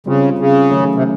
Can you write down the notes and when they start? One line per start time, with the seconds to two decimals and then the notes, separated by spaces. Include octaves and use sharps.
0.06 C#3 G3 C4 F4
0.39 C#3
0.71 D#3 F#3 A3 C#4
0.95 C3